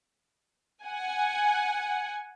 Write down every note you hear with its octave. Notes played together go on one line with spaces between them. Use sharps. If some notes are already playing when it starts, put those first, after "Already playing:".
F#5 G#5